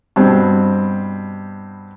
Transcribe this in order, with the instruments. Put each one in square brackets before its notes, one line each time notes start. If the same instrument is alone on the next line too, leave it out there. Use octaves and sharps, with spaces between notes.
[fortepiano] G2 B2 C4